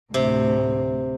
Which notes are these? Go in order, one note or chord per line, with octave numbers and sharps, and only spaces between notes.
D2 A2 C3